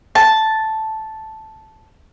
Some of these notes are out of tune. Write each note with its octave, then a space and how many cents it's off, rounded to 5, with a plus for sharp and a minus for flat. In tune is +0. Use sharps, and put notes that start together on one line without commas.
A5 -5